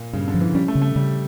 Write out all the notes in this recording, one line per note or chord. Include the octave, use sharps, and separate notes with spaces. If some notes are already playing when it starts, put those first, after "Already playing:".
Already playing: A#2
G2 C#3
D3
F3
E3
G3 C#4
A3
C#3
A3
C#3 G3